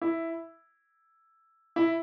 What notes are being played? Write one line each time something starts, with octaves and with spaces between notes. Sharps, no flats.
E4
E4